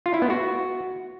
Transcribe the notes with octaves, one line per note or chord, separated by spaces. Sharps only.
F4
E4
B3
F#4